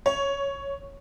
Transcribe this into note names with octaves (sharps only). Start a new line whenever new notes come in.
C#5